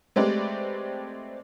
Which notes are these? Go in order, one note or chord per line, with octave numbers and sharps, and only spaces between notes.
G#3 A3 C4 G4 B4 D5